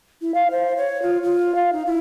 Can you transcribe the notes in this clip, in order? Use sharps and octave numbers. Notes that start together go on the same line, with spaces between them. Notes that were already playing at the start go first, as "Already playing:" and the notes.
E4
F5
C5
C#5
F4
F4
F5
D#4
E4